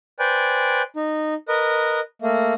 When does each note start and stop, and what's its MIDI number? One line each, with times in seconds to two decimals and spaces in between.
0.19 0.82 71
0.19 0.82 72
0.19 0.82 74
0.19 0.82 79
0.19 0.82 80
0.96 1.34 63
1.48 2.00 70
1.48 2.00 71
1.48 2.00 75
2.22 2.54 57
2.22 2.54 58